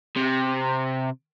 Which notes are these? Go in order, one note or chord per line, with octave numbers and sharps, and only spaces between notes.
C3